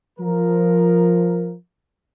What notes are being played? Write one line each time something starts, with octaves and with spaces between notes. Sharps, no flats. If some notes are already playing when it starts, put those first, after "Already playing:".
F3 A#4